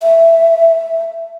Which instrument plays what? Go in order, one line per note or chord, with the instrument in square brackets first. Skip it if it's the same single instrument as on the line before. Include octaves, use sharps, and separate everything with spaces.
[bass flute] E5